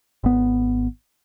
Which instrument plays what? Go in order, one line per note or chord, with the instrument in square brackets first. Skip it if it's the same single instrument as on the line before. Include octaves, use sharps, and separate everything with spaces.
[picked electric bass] G#1 B3